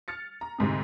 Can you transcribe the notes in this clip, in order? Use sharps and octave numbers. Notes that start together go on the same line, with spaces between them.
F6 A6 C#7
A#5
D2 G#2 C3